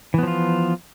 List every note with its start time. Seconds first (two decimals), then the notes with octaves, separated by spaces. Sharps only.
0.14 E3
0.18 B3
0.23 F3
0.27 F4